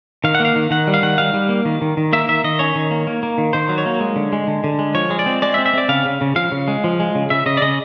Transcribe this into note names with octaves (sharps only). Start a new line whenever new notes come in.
D#3 F5
F#5
A#3
F5
D#3
D#3 F#5
G3
F5
D#3 F#5
G3 F5
G3
A#3
D#3
D#3
D#3
A#3 E5
D#3 E5
D#3 D#5
C#4 C#5
D#3
A#3
A#3
A#3
D#3
D#3 C5
F#3
C#5
A#3
G#3
D3
G#3
D3
D3
G#3
F3 C#5
G#3
D5
C4
G#3 D5
E5
C4
E5
C4 D5
C#3 F5
C#3
C#3
F3 F5
C#3
G#3
F3
G#3
C#3
C#3 E5
C#3 D#5
D5
C#3 D#5